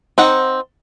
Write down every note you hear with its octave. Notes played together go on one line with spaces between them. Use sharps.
C4 D#4 F#5